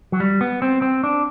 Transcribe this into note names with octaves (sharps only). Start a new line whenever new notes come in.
F#3
G3
B3
C4
C4
D4